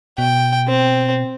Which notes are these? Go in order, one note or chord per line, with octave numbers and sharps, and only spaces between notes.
B2 G5
C4